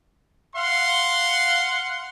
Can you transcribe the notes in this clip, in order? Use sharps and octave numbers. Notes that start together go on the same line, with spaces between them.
F5 F#5 C6